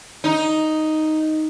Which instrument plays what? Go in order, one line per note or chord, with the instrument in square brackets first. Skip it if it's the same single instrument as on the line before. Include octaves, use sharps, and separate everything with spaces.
[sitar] D#4